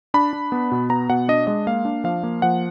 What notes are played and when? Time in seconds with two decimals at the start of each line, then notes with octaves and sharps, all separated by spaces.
0.14 D4 B5
0.33 D4
0.52 B3
0.72 B2
0.90 B3 A#5
1.09 B2 F#5
1.28 D4 D#5
1.47 G#3 D#5
1.67 A#3 F5
1.85 D4
2.04 F3 F5
2.23 A#3
2.42 F3 F#5